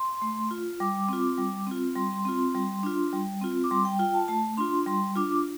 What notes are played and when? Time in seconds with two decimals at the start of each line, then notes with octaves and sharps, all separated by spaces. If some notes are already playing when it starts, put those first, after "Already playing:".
Already playing: C6
0.22 A3
0.51 F4
0.80 G3 D6
1.09 C4 F4
1.38 G3
1.67 C4 F4
1.95 G3 C6
2.25 C4 F4
2.55 G3
2.83 D4 F4
3.13 G3
3.41 C4 F4
3.64 D6
3.71 G3 C6
3.85 G5
3.99 F4 G5
4.14 A5
4.28 A3 A5
4.57 D4 F4 C6
4.87 G3 C6
5.15 D4 F4 D6